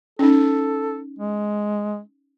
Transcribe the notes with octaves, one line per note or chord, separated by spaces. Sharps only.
C#4 D#4 A4
G#3